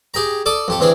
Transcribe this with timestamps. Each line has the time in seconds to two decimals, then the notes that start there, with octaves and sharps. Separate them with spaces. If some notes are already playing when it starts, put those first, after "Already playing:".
0.14 G4 G#4 G5 A#5
0.46 A4 D5 D6 D#6
0.68 F2 G4 A4
0.80 C3 E3 C4 D4 G#4